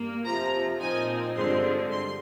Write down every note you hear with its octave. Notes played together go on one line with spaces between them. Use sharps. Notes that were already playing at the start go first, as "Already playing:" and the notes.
Already playing: G2 A#3
F2 C3 F3 A#5
A#2 F3 C4 D#4 G#5
G2 D3 F3 G#3 C4 C6
G2 C6